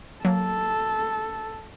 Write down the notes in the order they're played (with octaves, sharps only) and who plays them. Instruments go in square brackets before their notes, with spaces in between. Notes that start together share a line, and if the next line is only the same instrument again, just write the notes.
[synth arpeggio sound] F#3 A#3 [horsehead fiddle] A4